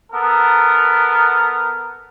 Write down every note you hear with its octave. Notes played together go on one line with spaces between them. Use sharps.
B3 A4 A#4